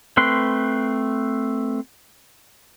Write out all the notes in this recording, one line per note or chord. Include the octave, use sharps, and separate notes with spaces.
A3 C4 B4 C6